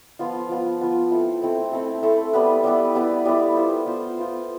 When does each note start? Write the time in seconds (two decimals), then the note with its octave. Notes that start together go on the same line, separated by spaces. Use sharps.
0.19 F3 B3 F4
0.49 F3 B3 F4
0.81 F3 B3 F4
1.11 A3 C4 E4 A4
1.42 A3 C4 E4 A4
1.72 A3 C4 E4 A4
2.03 A3 C4 E4 A4
2.33 G3 B3 E4 B4
2.64 G3 B3 E4 B4
2.95 G3 B3 E4 B4
3.25 G3 B3 E4 B4
3.55 B3 F4 C5
3.86 B3 F4 C5
4.18 B3 F4 C5